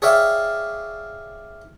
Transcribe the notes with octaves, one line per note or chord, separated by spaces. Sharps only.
G#4 C#5 D5 E5 F5 G5